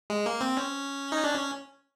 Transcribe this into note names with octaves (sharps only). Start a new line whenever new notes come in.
G#3
A#3
C4
C#4
D#4
D4
C#4